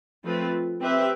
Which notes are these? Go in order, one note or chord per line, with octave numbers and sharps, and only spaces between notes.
F3 A3 C4 F4 B4
C4 G4 B4 E5